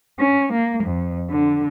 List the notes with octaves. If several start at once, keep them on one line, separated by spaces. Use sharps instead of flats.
C#4
A#3
F2
D3